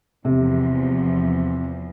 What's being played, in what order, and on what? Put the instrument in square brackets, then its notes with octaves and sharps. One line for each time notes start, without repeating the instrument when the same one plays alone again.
[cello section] E2 F3 [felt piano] C3